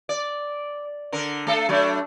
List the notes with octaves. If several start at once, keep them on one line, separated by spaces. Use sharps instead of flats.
D5
D3 A#4
A3 A4
F#3 A3 D4